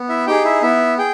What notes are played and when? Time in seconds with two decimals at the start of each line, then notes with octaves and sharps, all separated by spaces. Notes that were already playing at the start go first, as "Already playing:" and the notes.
Already playing: B3
0.09 E4 E5
0.27 D#4 G4 G#4 G5
0.44 E4 E5
0.62 B3 E4 E5
0.98 G#4 G5